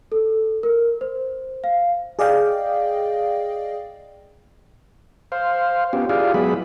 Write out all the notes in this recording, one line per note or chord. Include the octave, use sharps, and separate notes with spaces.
A4
A#4
C5
F5
G#4 D5 D#5 F5 G5
C5 F5
B3 C#4 F4 G4
E4 F4 G4 G#4 D5 F5
F#3 G#3 B3 E4 G#4 B5